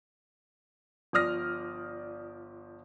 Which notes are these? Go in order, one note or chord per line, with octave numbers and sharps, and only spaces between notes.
G1 F3 D5 D#6 F6 A#6